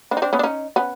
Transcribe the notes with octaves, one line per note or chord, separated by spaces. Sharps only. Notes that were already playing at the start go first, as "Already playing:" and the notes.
C4 D4
D#4
C4 D4
B3 C#4
D4
C#4 D#4
B3 C#4